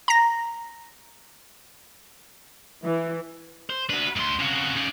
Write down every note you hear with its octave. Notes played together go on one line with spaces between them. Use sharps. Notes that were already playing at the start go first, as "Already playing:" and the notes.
A#5 A#6
E3
C5
D4 F#4 B4
D2 G#2 C6
C3 C#4 F#4 F5
D#4 D5